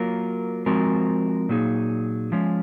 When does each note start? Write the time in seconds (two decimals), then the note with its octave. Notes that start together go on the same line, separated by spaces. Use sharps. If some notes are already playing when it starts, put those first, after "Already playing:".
Already playing: F#3 A#3 F4 A#4
0.66 F3 G#3 C4 F#4 A#4
1.49 A#2 F#3 A#3 D#4 G#4
2.32 F3 G#3 C#4